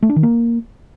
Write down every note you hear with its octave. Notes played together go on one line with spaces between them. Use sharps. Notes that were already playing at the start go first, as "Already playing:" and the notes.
A3
D4
D#3
A#3